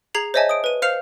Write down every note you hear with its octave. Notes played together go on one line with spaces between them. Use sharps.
G#4 A#5 G#6 C7 F7 F#7
C5 C#5 D#5 E5 G#5 A5
D#6 D7
B4 D#7
C5 F5 F6 C7 C#7 F7